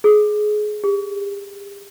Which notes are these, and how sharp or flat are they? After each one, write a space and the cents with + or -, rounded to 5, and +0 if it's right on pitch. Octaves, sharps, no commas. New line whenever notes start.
G#4 +20
G4 +35